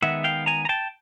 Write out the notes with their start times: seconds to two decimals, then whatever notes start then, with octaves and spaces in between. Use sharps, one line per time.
0.02 D#3 G#3 B3 E5 F#5
0.24 F5 G5
0.46 G#5 A#5
0.65 A#5
0.69 G5 A5